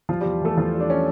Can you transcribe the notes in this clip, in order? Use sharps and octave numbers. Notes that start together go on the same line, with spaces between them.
F3 G3 F4
E2 G3 G4
E3 A3 A4
E2 F3 F4
G3
D4
C#4